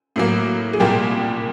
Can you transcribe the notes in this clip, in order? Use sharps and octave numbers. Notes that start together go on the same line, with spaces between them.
A2 F#3 A#3
G#4
C2 A#2 G3 A#3 G4